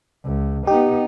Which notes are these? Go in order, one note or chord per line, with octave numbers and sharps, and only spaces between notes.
C#2
B3 D#4 G4